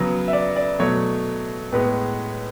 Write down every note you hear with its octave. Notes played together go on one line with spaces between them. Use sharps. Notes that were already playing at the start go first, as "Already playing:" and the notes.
Already playing: C#3 F#3 B3
E5
D5
D5
B2 F#3 A3 C#5
A2 G#3 B3 B4